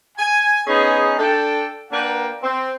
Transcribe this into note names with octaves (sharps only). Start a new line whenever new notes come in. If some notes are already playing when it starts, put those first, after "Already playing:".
G#5
B3 C#4 D#4 G#4
D4 A4 G5
A#3 D4 A#4 B4 F#5 G5
C4